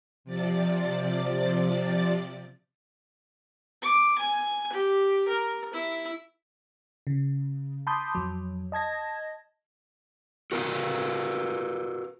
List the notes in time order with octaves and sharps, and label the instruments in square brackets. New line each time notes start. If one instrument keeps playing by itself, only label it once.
[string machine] C3 F3 D5 A6
[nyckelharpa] D6
G#5
G4
A#4
E4
[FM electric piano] C#3
A5 B5 C6 D6 D#6 G6
F2 F#3
D#5 A5 G#6 A#6
[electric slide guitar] F#4 A#4 B4 F5